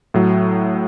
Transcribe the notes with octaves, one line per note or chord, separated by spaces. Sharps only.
A2 F#3